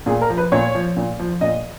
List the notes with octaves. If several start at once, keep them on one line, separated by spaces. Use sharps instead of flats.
A#2 G#4
A#4
F3
B4
A#2 C#5
F3
A#2
F3
A#2 D#5